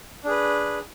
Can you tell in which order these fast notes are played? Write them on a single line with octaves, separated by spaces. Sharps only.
D4 G#4 B4